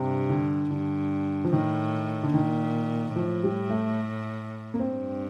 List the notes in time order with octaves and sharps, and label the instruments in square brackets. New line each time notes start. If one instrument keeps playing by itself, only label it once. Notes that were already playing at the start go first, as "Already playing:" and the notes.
Already playing: [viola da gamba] G2 [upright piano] C3
[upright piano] D3
[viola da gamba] G2 [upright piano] D3
[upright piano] F3
[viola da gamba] A2 [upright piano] D#3
[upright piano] D3
[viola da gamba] A#2 [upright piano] D#3
[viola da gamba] A2 [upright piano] F3
[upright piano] G3
A3
A#3
[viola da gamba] G2 [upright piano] C4